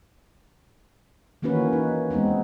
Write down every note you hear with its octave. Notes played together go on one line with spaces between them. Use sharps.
D#3 E3 A#3 C#4 F#4 B4
D#4
G#3 B3 C4 D#4